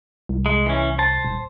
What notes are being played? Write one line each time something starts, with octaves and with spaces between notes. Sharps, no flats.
C2
G#3
E3 C#4
C5 A5
D#1